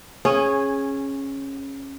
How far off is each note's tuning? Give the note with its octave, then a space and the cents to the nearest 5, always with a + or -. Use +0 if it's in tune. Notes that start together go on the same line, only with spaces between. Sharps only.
C#4 -15 G#4 +0